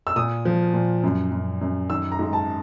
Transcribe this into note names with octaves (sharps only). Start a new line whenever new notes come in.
E6
A#2 D#6
F3
A#2
F#2
F#2
F#2
D#3 E6
A#5
G#2
A5